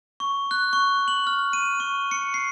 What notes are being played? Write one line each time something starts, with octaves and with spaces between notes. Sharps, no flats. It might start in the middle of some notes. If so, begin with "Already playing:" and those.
C#6
F#6
C#6
F#7
F6
D#7
C#6
C#7
C7